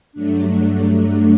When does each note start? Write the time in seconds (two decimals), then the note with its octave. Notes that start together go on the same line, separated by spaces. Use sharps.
0.12 G2 F#3 A3 D4